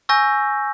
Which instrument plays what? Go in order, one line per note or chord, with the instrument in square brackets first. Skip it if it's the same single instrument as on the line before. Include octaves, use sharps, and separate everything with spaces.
[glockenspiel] G#5 C#6 E6 G6 A#6